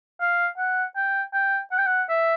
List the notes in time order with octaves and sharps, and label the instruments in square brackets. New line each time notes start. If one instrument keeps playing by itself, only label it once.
[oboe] F5
F#5
G5
G5
F#5
G5
F#5
E5